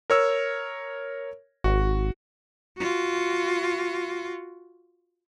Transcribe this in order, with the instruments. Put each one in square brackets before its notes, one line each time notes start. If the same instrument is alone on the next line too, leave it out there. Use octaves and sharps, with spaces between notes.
[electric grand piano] A#4 C#5 E6
[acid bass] G#1 [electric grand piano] F#4
[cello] F4 F#4